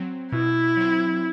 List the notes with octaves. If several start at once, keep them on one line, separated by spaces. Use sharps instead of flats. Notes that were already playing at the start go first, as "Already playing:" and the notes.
Already playing: F#3 C4
B2 E4
F#3 C4